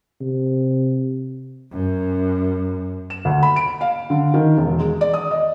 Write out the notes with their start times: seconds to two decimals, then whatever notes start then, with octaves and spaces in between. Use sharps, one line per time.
0.21 C3
1.73 F#2
3.10 E7
3.25 D2
3.43 B5
3.56 D7
3.81 F5
4.10 D3
4.34 D#3
4.58 E1
4.79 G#3
5.01 D5
5.14 D#6
5.31 D#5